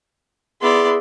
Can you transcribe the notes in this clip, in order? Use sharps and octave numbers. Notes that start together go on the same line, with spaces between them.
B3 E4 G#4 D5 C6